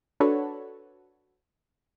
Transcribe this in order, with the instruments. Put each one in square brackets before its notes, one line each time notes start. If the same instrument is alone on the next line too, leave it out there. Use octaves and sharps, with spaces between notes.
[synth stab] D4 F#4 A4 B4 C#5